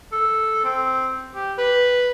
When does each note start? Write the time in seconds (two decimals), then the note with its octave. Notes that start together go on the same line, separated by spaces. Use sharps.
0.12 A4
0.64 C4
1.35 G4
1.58 B4